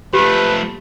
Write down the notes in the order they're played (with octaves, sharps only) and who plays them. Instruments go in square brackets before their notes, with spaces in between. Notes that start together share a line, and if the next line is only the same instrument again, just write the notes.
[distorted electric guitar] F3 A3 [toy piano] G4 [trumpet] B4